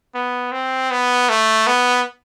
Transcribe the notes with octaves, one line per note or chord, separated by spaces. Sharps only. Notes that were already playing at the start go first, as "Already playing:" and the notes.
B3
C4
B3
A3
B3